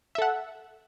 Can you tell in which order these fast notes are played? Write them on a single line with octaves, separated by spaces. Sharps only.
E5 A4 F#5